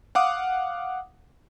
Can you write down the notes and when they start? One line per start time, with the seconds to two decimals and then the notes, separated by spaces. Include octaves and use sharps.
0.15 F5 F#5 D6 D#6